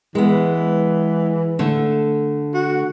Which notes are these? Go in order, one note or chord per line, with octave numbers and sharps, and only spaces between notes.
E3 G#3 B3
D3 A3
F#4